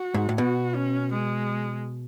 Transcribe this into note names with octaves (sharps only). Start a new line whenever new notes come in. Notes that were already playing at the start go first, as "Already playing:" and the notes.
Already playing: F#4
G#2
A2
B2 F#4
C#4
G#3